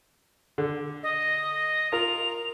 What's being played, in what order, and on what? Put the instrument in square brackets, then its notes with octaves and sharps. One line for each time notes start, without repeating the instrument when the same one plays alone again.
[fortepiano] D3
[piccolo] D#5
[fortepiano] F4 A#4 [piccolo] F7